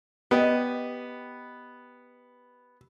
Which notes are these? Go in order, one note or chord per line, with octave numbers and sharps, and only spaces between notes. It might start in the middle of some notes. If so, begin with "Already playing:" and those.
B3 G4 D5 D#5